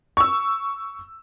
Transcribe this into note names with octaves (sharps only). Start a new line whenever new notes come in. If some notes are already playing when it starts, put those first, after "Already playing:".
C#6 E6